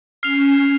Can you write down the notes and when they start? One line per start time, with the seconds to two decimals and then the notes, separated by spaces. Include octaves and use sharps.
0.23 C#4 F6 C7 F7